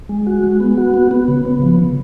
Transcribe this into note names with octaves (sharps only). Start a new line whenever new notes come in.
G#3
F#4
G#3
B3
F#4
B3
B3
C#3
B3
F3
C#3